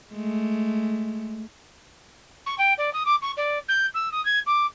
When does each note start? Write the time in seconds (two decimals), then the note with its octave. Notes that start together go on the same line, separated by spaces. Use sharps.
0.13 G#3 A3
2.46 C#6
2.58 G5
2.78 D5
2.94 D#6
3.06 D6
3.22 C#6
3.37 D5
3.69 G6
3.94 E6
4.12 D#6
4.25 G#6
4.47 D6